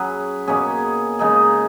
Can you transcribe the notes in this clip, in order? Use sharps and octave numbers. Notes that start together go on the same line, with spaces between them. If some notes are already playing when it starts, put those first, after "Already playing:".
Already playing: F#3 C#4 G#4 B4
B2 A#3 C#4 G#4
C#3 G#3 D#4 G#4